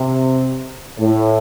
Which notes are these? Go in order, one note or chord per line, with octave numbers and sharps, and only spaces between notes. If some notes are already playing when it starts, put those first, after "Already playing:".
Already playing: C3
A2